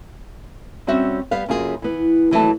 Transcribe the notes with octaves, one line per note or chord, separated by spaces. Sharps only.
G3 C4 C#4 F#4 E5
G3 B3 F5
F#2 C#3 A#3 F4 F#4 G#4
E3 B3
D#2 E3 F#3 A3 E4 A5